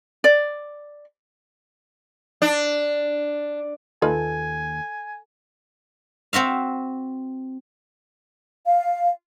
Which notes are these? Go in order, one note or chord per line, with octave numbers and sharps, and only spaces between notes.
D5
D4
D#2 F4 A4 B4 D#5 G#5
C4 F#4 E5 F5
F5